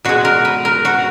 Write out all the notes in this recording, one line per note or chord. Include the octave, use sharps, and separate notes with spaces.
B2 G#3 F#4
A#4
B4
A#4
F#4